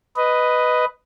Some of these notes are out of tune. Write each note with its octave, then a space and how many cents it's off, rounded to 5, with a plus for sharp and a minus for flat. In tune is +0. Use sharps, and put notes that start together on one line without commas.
B4 +5 D#5 +0